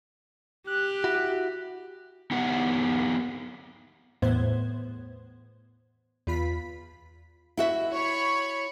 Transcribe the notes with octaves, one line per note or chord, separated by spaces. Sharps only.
G4 F#6
E4 F#4
B3 D#4 G4 B4 F#5
E2 A2 B3 C5 G#6
E2 F4 B5 B6
E4 F#4 E5
C#5 B5 C#6